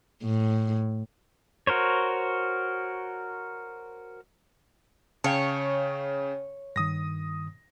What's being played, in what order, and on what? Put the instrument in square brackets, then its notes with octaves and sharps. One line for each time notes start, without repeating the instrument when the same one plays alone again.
[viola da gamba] A2
[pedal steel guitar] F#4 A#4 C5 C#5
[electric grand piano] C#3 F5 G5 [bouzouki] C#5 [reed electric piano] A5
[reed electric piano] G2 D#3 [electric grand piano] D#6 A#6